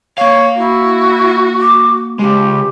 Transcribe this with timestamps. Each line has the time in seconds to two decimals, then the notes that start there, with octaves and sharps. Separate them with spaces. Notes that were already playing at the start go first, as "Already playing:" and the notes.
0.18 A#3 C#5 F5
0.58 E4 F#4
1.60 D6
2.19 C#2 G#3 G4